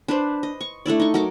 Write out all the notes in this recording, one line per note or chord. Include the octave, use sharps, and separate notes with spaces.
D4 B4 C5
D#5
C#6
A3 D4 E4 D5
D#4 C#6
F#3 A#4 D6